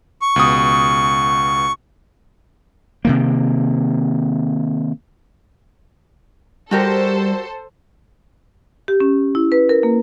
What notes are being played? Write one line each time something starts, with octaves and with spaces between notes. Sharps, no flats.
C#6
C#2 B2 D#6
C3 D#3 A#3
G3 F#4 G4 A4 A#4 C5
G4
C#4
E4
B4
A#4
A#3